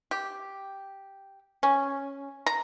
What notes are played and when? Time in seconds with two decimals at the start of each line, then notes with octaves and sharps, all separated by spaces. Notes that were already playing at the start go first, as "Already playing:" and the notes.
0.11 G4
1.63 C#4
2.46 A#5